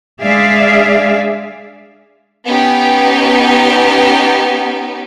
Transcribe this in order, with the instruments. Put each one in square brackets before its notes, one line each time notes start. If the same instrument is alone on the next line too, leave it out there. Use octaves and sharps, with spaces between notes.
[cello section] G#3 D4 G#4 D5 E5 F5
[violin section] B3 C#4 D#4 G4